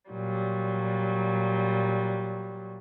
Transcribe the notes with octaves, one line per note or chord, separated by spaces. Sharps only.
A#2 F#3 G3